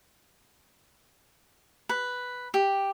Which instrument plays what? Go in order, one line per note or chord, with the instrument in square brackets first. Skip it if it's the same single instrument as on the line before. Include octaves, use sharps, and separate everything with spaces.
[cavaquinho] B4
G4